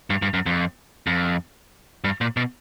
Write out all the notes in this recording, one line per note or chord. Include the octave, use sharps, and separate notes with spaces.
G2
G2
F#2
F2
F2
G2
A#2
B2